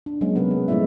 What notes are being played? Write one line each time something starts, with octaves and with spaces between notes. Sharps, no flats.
D4
F#3 G#3 A#3 C#4
C3 B3 C#4 G#4 A#4 B4
G#4
F3 G#3 A3 E4 D5 E5